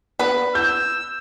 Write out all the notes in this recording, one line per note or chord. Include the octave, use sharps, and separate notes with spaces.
B3 D4 B4
E6 G6